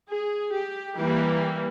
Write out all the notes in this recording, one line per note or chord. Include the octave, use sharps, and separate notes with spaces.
G#4
G4
E3 G3 A#3 G4